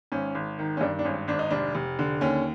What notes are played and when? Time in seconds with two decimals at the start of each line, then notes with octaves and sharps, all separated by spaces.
0.12 G#1 C#4
0.35 G#1
0.59 D#3
0.77 C#4
0.81 G2 D4
0.99 D4
1.05 G#1 C#4
1.28 G#1 D4
1.39 D#4
1.50 F1 D4
1.75 F1
1.99 D3
2.21 D#2 C#4